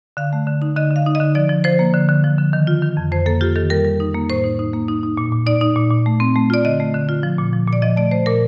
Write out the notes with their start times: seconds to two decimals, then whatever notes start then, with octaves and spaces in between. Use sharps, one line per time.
0.17 D3 F5
0.33 A3
0.47 D3
0.62 D#4
0.76 D3 D#5
0.91 D3 F5
1.06 D#4
1.15 D#5
1.20 D3
1.35 F3 D5
1.49 F3
1.64 F3 C5
1.79 A#3
1.94 D3
2.08 D3
2.24 F3
2.38 D3
2.53 D#3
2.67 F4
2.82 D#3
2.97 F2
3.12 F2 C5
3.26 A#3 A4
3.41 F4 G4
3.56 D#3 A4
3.70 G3 A#4
3.85 G3
4.00 D#4
4.15 A#3
4.30 A2 C5
4.44 D#4
4.59 D#4
4.74 A#3
4.88 D#4
5.03 D#4
5.17 A#2
5.32 A#2
5.46 D#4 D5
5.61 D#4
5.76 A#2
5.91 A#2
6.06 A3
6.20 C4
6.36 A3
6.50 F4 D5
6.65 D3 D#5
6.80 A3
6.94 D3
7.09 F4
7.23 F3
7.38 A#2
7.53 F3
7.68 A#2 D5
7.82 F3 D#5
7.96 A3 D5
8.11 A3 C5
8.26 A#2 A#4